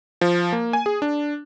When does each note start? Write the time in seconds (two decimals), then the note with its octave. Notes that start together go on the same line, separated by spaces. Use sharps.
0.21 F3
0.52 A#3
0.73 G#5
0.86 G#4
1.02 D4